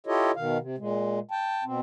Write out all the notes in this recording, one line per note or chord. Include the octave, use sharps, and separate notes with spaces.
E4 F4 G4 A4 C#5 D#5
B2 D#3 F5
C3
A#2 G#3
G5 A5
B2 C4